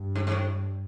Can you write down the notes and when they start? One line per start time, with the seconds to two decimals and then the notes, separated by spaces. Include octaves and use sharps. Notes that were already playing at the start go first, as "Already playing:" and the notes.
Already playing: G2
0.16 G#2
0.27 G#2
0.32 A2